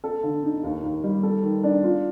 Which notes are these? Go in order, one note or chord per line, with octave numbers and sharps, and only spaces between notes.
A4
D3
D#4
D#2
D#2
G3
A4
D#3
D4
F4